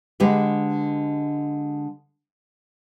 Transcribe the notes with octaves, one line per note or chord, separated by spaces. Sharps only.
D3 G#3 G4 B4